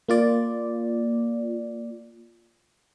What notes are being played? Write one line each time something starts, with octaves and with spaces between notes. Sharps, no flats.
A#3 F4 D5